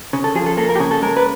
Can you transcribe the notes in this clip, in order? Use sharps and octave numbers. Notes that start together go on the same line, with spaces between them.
C#3
A4
F3 G#4
A4
A#3 A4
A#4
G4
C#3 G#4
A4
G#3 A#4
B4